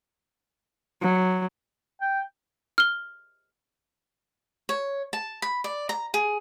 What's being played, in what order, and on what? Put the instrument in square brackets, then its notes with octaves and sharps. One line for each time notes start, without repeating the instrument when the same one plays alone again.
[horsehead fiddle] F#3
[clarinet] G5
[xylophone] F6 G7
[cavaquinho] C#5
A5
B5
D5
A#5
G#4